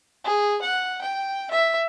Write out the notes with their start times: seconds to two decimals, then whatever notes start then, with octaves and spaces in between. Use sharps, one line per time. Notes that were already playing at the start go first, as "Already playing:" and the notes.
0.24 G#4
0.62 F#5
1.01 G5
1.51 E5